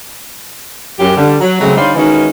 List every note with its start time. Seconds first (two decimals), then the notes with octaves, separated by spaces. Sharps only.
0.99 F#2 G4
1.17 D3 G3
1.41 F#3
1.60 C#3 F#3 G#3 A3 C4
1.76 D3 G3 D#4 C5 C#5 F5
1.95 D#3 E3 G#3 C#4 D#4 F#4